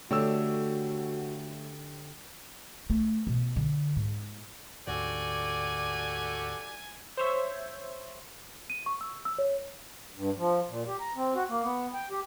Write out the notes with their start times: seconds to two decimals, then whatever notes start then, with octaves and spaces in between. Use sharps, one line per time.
0.11 D3 A3 F#4 G4 C#5 E6
2.90 A3
3.27 B2
3.56 D3
3.96 G#2
4.87 D2 G#2 D3 F#4 G4 A4 D5 G#5
7.17 C5 C#5 E5
8.70 D#7
8.86 C#6
9.01 E6
9.25 E6
9.38 C#5
10.16 G2
10.38 F3
10.69 A#2
10.87 G4
11.00 A#5
11.16 C4
11.35 F#4
11.50 A#3
11.63 B3
11.94 G5
12.11 G4